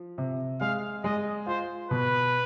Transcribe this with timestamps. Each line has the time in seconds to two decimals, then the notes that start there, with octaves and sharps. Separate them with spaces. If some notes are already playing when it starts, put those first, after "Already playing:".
Already playing: F3
0.18 C3
0.61 G#3 F5
1.04 G#3 D#5
1.46 F4 C5
1.90 B2 B4